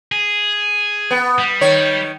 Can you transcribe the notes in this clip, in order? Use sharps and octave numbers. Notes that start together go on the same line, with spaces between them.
G#4
B3
G3
D#3 C#5